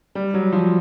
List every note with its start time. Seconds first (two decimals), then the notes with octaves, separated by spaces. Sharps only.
0.15 G3
0.34 F#3
0.52 F3